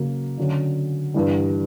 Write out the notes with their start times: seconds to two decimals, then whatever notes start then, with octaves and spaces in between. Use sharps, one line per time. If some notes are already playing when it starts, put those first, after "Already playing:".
Already playing: C#3 F#3 A#3
0.38 D3 F#3 C#4
1.14 G2 E3 G3